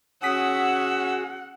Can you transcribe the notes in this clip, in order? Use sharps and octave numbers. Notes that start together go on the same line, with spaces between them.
C#4 F#4 G#4 F#5 D#6 E6 B6